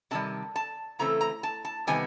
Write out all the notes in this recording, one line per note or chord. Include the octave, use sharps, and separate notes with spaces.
C3 D#3 G3 A5
A5
C#3 E3 A3 C4 A#5
A#5
A5
A5
C3 D#3 G3 B3 G#5